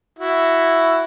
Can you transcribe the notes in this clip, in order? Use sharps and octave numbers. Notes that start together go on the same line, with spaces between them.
E4 F#4